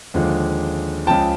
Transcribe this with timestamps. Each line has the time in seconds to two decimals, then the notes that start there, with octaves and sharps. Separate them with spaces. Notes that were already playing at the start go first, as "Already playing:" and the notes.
0.14 D#2 D3 F3 G#3
1.06 C#2 C#3 F3 G5 A5